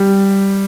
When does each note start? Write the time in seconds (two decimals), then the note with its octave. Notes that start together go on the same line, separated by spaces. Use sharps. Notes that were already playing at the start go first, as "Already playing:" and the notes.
Already playing: G3